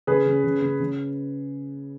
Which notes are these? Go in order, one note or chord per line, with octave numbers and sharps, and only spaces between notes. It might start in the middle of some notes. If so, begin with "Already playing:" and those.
C#3 G#4 B4
C#3
C#3
C#3
C#3